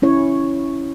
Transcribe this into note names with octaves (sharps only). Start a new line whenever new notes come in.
C#4 E4 C#5